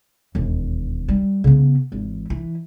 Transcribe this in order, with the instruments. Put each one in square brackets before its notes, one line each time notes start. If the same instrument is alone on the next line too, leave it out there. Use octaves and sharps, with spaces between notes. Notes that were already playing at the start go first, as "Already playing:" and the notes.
[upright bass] E1 D#2
G3
C#3 B3
G#1 E3
E3